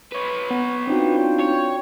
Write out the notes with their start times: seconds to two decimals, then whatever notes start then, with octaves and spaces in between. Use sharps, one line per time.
0.12 B4 C#5
0.51 B3
0.87 C4 D4 D#4 F4 F#4 G5
1.41 C#5